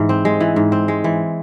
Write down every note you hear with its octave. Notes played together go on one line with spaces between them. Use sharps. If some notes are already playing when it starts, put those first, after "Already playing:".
Already playing: G#2 E3
C4
G#3
E3
G#2
C4
G#3
E3